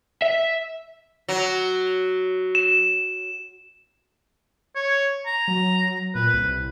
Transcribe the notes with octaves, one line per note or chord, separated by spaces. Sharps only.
E5
F#3
E7
C#5
A#5
F#3
A#2 B4
C2